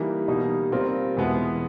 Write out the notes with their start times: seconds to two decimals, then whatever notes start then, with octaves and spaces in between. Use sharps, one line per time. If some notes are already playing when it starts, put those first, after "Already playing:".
Already playing: E3 G3 A#3 D#4
0.28 B2 G3 A#3 D#4
0.72 A#2 G3 C4 F4 A#4
1.17 E2 B2 G#3 B3 E4